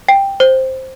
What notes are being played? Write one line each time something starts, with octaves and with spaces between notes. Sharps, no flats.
G5
C5